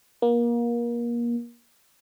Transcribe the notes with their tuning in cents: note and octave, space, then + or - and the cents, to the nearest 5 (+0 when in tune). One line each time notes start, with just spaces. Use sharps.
A#3 +30